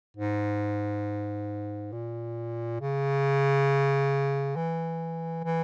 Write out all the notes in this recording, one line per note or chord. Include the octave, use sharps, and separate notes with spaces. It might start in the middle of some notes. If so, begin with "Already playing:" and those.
G#2
A#2
C#3
E3
E3